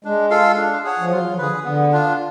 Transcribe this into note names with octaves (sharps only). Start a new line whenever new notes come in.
G#3 D4
F4 A4 F5
D4
G#4 C#5 F#5
F3
F#3 F4
F3
D3 G#4 B4
D3 B3
D4 F4